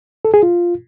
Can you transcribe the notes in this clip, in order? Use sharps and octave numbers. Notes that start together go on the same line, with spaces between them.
A4
G#4
F4